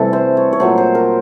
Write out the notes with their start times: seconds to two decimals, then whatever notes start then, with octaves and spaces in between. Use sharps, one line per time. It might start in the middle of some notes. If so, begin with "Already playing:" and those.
Already playing: C3 E3 G3 A3 A4
0.13 C5
0.37 C#5
0.53 C#5
0.60 A#2 F#3 A3 C5
0.78 C5
0.95 A#4